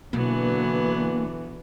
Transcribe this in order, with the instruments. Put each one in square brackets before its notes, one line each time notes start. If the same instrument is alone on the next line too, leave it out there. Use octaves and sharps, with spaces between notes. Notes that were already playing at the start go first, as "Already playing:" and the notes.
[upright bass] B2 [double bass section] D3 E3 [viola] F#3 B3 [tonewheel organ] A#3